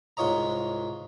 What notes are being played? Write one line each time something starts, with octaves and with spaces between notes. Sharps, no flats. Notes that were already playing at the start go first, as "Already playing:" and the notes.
C2 G#2 F4 C#5 D#5 A#5